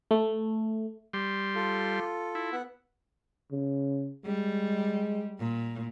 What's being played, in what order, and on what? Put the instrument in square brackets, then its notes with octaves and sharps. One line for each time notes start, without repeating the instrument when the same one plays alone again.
[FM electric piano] A3
[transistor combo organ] G3 C6
[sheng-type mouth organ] F4 A4
[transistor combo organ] E4
[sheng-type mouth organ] B3 F#5
[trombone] C#3
[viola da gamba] G3 [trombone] G#3
[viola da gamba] A#2